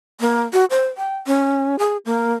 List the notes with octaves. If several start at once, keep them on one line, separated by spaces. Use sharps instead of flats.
A#3
F#4
C5
G5
C#4
G#4
A#3